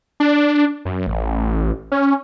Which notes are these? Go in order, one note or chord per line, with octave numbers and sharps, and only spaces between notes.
D4
F#2
A1
C#4